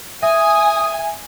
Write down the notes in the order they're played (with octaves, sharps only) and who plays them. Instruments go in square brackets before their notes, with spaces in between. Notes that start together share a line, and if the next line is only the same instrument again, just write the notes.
[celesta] E5 [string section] G#5 [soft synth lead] D#6